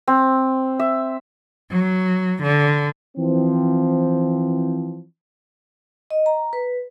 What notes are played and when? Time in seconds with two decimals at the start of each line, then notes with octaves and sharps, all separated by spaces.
0.08 C4
0.79 E5
1.70 F#3
2.42 D3
3.17 E3 F3 C4
6.11 D#5
6.26 A#5
6.53 B4